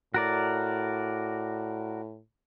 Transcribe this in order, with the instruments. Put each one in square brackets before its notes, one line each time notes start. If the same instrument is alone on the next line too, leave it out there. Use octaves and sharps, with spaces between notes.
[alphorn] A2 [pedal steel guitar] F#4 A#4 D5